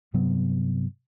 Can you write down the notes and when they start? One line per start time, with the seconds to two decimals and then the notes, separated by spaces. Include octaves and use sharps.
0.14 G2 C3 F#3 B3